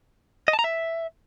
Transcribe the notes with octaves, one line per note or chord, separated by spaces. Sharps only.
D#5
A5
A#5
E5